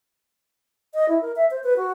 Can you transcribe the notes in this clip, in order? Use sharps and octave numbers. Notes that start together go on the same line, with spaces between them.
D#5
E4
A#4
E5
C5
B4
F#4